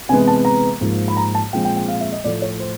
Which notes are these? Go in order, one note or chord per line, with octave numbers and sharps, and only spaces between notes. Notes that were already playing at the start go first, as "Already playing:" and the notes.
C3 E3 G#3 B3 G#5
A5
A#5
G#2 F3 A#3
B5
A#5
A5
A#2 F3 G#3 C4 G5
G5
G5
F5
E5
D#5
A2 F3 A3 D5
C#5
C5